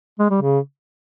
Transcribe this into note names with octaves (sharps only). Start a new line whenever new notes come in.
G#3
G3
C#3